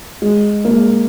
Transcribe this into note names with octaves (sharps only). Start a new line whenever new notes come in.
G#3
A#3
G#3